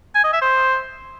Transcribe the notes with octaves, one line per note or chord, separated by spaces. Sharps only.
G#5
D#5
E5
C5